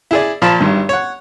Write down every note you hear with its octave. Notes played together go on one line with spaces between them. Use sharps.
E4 G#4 D5
A#2 F3 F5 A5 B5
G#1 G2 D#3
C#5 F#5